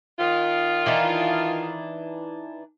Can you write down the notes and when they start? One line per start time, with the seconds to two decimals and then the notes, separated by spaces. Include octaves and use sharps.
0.19 D#3 F4
0.86 E3 D4 D#4